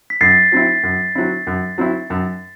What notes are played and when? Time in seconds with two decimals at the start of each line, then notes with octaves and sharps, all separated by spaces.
0.10 B6
0.21 F#2 A6 C7
0.52 F#3 C4 E4
0.83 F#2
1.15 F#3 C4 E4
1.47 F#2
1.78 F#3 C4 E4
2.10 F#2